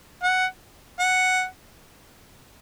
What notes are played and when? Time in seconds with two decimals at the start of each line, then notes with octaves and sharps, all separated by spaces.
0.23 F#5
1.00 F#5